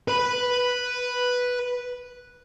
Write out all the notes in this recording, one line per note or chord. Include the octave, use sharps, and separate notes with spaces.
B4 B5